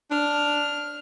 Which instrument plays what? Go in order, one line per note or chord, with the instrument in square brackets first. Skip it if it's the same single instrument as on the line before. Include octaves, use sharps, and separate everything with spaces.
[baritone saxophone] D4 [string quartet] F6